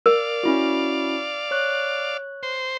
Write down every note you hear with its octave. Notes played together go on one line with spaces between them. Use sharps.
A#4 D5 F5
C#4 E4 F#4
C#5 C#6 F#6
C5